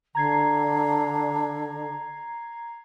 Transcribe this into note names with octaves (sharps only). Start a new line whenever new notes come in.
D3 A#5 G#6 C7